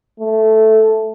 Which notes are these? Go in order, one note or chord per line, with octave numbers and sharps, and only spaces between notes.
A3